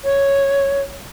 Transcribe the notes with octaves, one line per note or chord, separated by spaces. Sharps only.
C#5